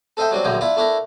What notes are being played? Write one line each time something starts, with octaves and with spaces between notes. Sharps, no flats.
A4 C5 D#5 E5 G5
F#3 G3 C4 D4
A#1 F#2 A2 D3 G5
D4 E4 F4 D5
A3 D4 E4 A#4